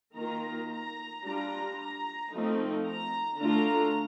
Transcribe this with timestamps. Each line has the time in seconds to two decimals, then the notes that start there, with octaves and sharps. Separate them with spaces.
0.16 D#3 A#3 F4 A#5
0.70 A#5
1.25 G3 D4 F4 A#5
1.79 A#5
2.32 F3 A3 C4 D#4
2.87 A#5
3.41 D3 A3 D4 F4 A#5